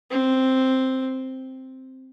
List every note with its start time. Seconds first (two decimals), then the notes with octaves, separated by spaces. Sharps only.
0.11 C4